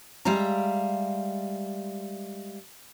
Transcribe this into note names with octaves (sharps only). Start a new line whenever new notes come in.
G3 G#3 E5 F5 A#5